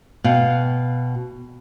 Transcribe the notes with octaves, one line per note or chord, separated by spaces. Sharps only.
B2 F5 G5